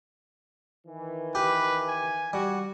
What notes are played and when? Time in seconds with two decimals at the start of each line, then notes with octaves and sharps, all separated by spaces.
0.86 D#3 E3
1.35 G4 B4
1.88 G#5
2.33 G3 F#4